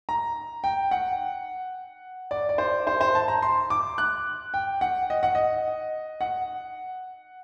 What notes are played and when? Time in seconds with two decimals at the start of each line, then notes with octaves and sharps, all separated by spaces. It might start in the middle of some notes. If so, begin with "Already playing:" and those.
0.09 A#5
0.64 G5
0.91 F#5
2.31 D5
2.49 D5
2.58 C5
2.87 C5
3.01 C5
3.15 A5
3.28 A#5
3.42 C6
3.70 D6
3.98 F#6
4.54 G5
4.81 F#5
5.10 D#5
5.23 F#5
5.35 D#5
6.21 F#5